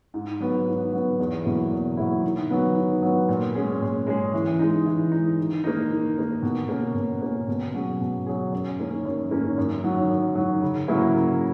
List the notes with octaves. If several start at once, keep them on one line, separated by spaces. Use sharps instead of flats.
G#2
F#3 B3
G#2
F#3 B3
E2
B2 F#3 A#3 E4
E2
B2 F#3 A#3 E4
D#3
F#3 B3
D#3
F#3 B3
A#2
G#3 C#4 G#4
A#2
G#3 C#4 G#4
E3
G#3 D#4
E3
G#3 D#4
D#3
A#3 D#4
D#3
A#3 D#4
B2
A#3 C#4
B2
A#3 C#4
B2
F#3 C#4 G#4
B2
F#3 C#4 G#4
F#2
D#3 A#3 C#4
F#2
D#3 A#3 C#4
F#2
D#3 F#3
F#2
D#3 F#3
C#3
F#3 A#3 C#4 E4
C#3